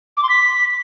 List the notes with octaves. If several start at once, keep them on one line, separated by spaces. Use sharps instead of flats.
D6
C6
B6